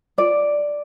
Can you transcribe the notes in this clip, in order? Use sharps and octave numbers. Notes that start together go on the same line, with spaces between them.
F4 D5